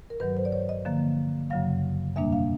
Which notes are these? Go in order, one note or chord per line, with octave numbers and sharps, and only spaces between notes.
A#4
G2 D#3 F#3 B4
C5
D5
C#5
D#5
D3 F3 A#3
F#2 C#3 F#3 F5
E2 B2 G3 A#3 D4 E5
F5